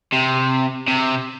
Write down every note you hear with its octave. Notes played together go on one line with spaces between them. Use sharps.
C3
C3